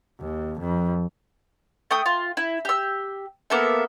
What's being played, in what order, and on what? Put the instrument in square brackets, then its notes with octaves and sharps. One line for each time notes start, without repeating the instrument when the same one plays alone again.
[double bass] D#2
F2
[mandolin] A3 G5 D#6
F4
E4
G4 E6
A#3 B3 A4 E5